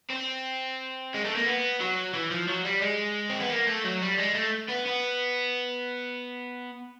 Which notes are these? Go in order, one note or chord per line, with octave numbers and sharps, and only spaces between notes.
C4
G#3
A3
A#3
B3
F#3
E3
F3
F#3
G3
G#3
C4
B3
A#3
A3
F#3
G3
G#3
A3
B3
B3